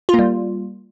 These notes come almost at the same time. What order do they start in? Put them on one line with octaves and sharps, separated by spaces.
F4 A#3 G3